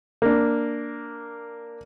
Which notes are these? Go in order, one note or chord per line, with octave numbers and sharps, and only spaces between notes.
A#3 D4